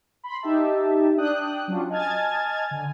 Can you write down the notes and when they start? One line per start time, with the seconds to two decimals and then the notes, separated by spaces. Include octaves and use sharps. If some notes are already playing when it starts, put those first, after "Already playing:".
0.24 B5 C6
0.42 D#4 G4 E5 A5
1.17 D4 G5 D#6 F#6
1.68 F#3 C#4 D4 F4
1.90 D#5 G#5 A5 F6 G#6 A6
2.71 D3 G#5